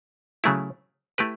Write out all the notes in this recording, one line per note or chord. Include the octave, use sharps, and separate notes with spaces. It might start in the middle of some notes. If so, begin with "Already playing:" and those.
C#3 F#3 A3 E4
A3 E4 G4 B4